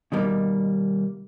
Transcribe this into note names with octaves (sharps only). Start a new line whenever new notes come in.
B2 D#3 G3 A#3